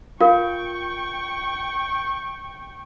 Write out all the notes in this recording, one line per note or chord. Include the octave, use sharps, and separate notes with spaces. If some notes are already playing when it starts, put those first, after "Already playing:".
F4 A#4 F5 G5 C#6